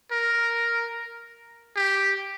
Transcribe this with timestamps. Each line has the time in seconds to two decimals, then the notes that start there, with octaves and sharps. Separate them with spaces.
0.12 A#4
1.77 G4